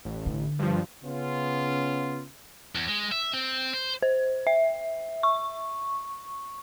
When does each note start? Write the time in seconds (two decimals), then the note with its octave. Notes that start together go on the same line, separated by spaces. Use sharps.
0.05 A1
0.26 D3
0.59 G2 F3
1.04 C#3 B3 C#4 F4
2.75 E2
2.88 G#3
3.12 E5
3.33 C4
3.73 C5
4.02 C5
4.47 E5
5.23 C#6